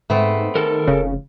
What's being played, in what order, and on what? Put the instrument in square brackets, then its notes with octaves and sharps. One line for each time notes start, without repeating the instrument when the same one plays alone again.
[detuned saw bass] G#2 [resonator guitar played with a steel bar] A3 B3 C4
[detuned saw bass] D#3 [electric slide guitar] A4 A#4
[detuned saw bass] F1 [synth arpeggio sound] C#3